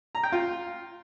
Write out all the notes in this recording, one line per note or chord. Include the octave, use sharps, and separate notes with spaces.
A#5
G5
F4